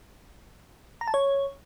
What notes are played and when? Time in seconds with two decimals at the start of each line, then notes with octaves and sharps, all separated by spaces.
1.01 A#5
1.07 A5
1.14 C#5